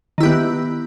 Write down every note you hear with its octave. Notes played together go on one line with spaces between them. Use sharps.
D#3 B3 E4 G4